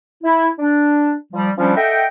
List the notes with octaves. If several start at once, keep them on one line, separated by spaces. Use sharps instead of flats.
E4
D4
F3 G3
F3 G3 C#4 D4
A4 D#5 E5 F#5 G5